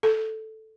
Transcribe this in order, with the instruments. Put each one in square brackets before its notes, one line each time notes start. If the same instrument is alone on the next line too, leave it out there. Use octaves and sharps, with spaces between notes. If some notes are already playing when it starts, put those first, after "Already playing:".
[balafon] A4